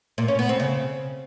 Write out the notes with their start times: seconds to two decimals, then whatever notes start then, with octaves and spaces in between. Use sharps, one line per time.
0.18 A#2
0.28 C#4
0.39 B3
0.49 C4
0.60 C#3